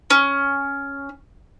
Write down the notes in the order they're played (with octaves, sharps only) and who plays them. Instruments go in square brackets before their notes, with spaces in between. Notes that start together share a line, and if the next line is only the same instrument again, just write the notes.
[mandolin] C#4